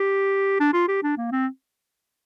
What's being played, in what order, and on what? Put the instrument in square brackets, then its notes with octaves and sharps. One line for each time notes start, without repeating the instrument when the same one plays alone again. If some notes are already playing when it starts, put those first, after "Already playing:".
Already playing: [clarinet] G4
D4
F4
G4
D4
A#3
C4